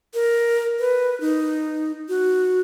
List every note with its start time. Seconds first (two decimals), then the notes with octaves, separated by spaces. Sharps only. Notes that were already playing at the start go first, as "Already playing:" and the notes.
0.14 A#4
0.79 B4
1.21 D#4
2.09 F#4